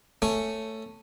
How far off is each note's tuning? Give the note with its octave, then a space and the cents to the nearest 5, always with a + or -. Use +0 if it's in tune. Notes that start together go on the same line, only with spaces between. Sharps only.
A3 +10 C#4 +0 C#6 +0